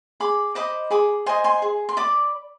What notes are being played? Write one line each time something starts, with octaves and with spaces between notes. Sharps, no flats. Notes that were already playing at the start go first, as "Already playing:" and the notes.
G#4 B5 D6
C5 D#5 B5 D6
G#4 B5 D6
C5 D#5 G#5 C6
G#5 C6
G#4
C6
D5 B5 D6